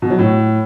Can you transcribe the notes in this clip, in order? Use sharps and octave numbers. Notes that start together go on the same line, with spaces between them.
B2
F#3
A2